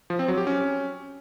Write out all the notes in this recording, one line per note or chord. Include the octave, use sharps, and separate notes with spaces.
F3
C4
F#3
G4
C#4